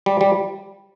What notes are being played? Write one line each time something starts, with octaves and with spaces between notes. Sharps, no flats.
G3
G3